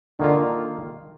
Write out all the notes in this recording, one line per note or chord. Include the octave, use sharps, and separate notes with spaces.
D3 D#3 A#3 F4